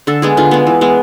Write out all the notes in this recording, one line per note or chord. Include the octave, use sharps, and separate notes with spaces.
D3 A4
G#3 B3 G#4
D3 F4
G#3 B3
E3
G#3 B3